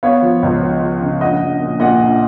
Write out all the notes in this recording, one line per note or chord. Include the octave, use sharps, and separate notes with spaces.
B3 C#5 F5
F3
C#2
F3
F3
C#3
A#1 D#5 F#5
A#1
A#2
A#2 D#5 F#5
A#1